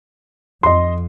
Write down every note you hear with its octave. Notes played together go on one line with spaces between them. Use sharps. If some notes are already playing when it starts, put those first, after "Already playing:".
F2 D#5 C6